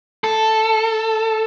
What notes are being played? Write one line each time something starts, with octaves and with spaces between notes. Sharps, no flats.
A4